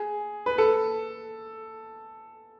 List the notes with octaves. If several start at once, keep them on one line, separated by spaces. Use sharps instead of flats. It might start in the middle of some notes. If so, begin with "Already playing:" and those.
Already playing: G#4
B4
A4